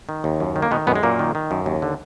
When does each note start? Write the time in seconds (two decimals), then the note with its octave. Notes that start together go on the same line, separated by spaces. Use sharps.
0.09 D#3
0.24 D#2
0.40 F#2
0.56 D#3
0.62 A#3
0.71 B2 D#3 B3
0.87 F#2 B2 B3
0.96 G#3
1.03 F#2 A#2 A#3
1.19 D#3
1.35 D#3
1.51 F#2
1.66 D#2
1.82 D3